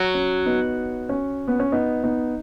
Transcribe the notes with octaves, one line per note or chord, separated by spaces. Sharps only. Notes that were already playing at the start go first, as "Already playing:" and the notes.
Already playing: F#3
C#4
B3 D#4
C#4
B3
C#4
B3 D#4
B3 D#4